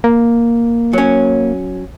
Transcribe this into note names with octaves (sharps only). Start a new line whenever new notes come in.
A#3
F#3 C#4